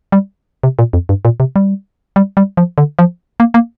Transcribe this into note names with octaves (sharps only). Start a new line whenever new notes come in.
G3
C3
A#2
F2
G2
A#2
C3
G3
G3
G3
F3
D3
F3
A#3
A#3